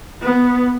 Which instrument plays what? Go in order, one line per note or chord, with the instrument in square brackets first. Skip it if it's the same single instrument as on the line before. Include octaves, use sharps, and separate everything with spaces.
[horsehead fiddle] B3